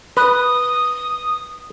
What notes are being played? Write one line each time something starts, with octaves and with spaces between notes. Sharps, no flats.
B4 D#6